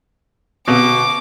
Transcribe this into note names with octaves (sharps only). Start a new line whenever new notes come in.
B2 D3 B3 C4 D6